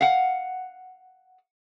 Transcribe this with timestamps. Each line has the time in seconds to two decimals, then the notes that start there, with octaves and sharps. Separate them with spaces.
0.01 F5 F#5